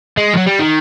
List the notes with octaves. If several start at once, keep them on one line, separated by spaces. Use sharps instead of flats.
G#3
F3 F#3
G3
D#3